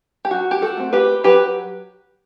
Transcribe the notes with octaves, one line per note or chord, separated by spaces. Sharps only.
G4
F#3 F#4
G4
F#4 A4
A3 C4
G4 B4
F#3 G4 B4